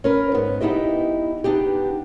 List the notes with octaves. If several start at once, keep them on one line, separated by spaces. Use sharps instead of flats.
C#4 A#4 B4
G#2 B3
B3 D#4 E4 G4 D#5
B3 D4 D#4 G4